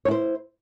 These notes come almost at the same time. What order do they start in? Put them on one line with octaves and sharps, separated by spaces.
C#5 E4 C5